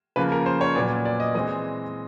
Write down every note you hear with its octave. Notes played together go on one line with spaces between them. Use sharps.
C#3 F3 A#3 B4
A#4
C5
C#5
A#2 F#3 B3 D5
D5
D5
D#5
E3 G#3 C4 D#5